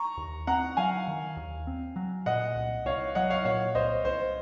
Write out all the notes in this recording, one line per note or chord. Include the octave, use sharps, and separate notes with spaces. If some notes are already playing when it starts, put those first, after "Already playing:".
Already playing: A#5 C#6
D#2
C4 F#5 A#5
F#3 F5 G#5
D#3
D#2
C4
F#3
A#2 D#5 F#5
C2
C2 C#5 F5
F#3 D#5 F#5
C#5 F5
A#2 C#5 F5
C2 C5 D#5
C2 C5